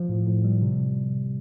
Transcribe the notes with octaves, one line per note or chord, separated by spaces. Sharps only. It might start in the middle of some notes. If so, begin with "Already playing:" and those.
Already playing: F3
A2
A2
G3
C3